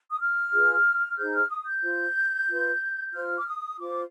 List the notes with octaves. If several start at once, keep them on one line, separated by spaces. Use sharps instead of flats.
D#6
F6
F4 G#4 B4
D#4 G#4 C5 G6
F6
D#6
G6
F4 C5
F4 B4
F4 C5 F6
D6
D#6
F4 C5 D6